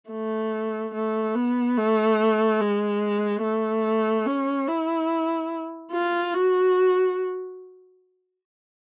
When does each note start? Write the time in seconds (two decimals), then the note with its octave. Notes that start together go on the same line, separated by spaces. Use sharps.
0.10 A3
0.95 A3
1.35 B3
1.78 A3
2.60 G#3
3.43 A3
4.26 C#4
4.68 E4
5.92 F4
6.34 F#4